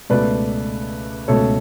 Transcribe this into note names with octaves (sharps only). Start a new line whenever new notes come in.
C#2 B2 A3 B4 D5
C#2 B2 A3 A4 C#5